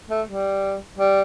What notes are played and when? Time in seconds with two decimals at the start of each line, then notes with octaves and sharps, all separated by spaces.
0.09 A3
0.27 G3
0.97 G3